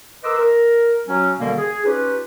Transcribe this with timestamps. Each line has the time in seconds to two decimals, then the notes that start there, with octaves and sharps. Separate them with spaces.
0.24 A#4 B4 D#5 C6 D6 E6
0.37 A#4
1.07 F#3 C#4
1.40 F#2 B2 D3 D#3 G3 A#3
1.58 G#4
1.85 C#4 D#4 F4 G4 B4